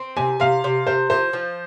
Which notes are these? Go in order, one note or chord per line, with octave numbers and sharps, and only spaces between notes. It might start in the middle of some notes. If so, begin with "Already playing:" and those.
Already playing: C4
C3 G#5
C3 F5
C3
C3 C5
F3 C5
F3